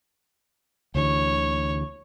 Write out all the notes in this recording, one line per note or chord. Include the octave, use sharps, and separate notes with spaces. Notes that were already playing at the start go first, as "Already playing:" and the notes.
D2 D3 E3 C#5